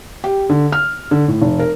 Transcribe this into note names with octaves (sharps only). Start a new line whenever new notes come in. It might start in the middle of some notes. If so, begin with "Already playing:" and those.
G4
D3
F6
D3
A2
F1
A#4